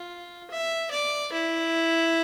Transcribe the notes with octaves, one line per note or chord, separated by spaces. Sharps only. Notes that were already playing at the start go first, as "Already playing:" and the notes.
Already playing: F4
E5
D5
E4